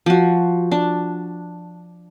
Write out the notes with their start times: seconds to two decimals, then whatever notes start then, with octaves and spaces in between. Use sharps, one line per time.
0.06 F3 F#4
0.72 D4